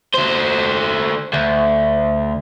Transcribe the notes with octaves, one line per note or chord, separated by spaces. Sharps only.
D3 C5
D2